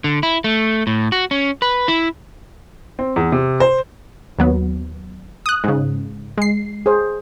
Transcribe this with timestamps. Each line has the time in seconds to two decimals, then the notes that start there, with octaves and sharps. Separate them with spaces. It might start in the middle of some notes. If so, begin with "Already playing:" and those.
0.04 D3
0.23 E4
0.44 A3
0.87 A2
1.12 F#4
1.31 C#4
1.62 B4
1.88 E4
2.99 C4
3.16 E2
3.32 C3
3.60 C5
4.39 D#2 F#3 B3
5.46 D#6 F#6
5.64 G#2 C#3
6.38 G#3 C7
6.86 G#4 C5